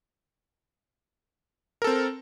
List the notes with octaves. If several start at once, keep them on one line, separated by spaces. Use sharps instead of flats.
C4 A4 A#4